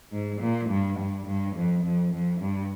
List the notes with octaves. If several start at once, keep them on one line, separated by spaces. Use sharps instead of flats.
G#2
A#2
G2
G2
G2
F2
F2
F2
G2